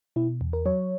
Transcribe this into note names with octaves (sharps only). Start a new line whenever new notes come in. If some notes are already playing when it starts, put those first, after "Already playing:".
B2 E4
E2
A#4
F#3 C#5